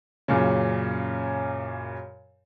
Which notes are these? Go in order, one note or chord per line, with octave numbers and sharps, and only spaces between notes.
F#2 A#2 C#3